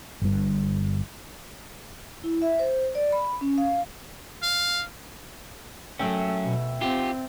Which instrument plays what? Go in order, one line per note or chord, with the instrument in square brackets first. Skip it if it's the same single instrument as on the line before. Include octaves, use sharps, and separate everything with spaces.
[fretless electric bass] G1 G2
[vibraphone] E4
E5
C5
D5
B5
C#4
F5
[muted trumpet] F5
[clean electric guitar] F#3 C#4 [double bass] A3 [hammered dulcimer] E5 G5
[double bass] B2
[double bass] C4 [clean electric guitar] F4 G4